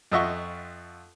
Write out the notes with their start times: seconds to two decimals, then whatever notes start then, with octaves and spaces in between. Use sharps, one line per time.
0.12 F2 F4 D#5 E5 F#5 C#6